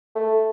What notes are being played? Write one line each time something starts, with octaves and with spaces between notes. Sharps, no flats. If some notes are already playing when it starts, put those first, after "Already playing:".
A3